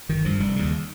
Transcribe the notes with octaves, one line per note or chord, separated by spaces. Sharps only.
G1 D#3
G2 F3
F1 G3
D#2 C#3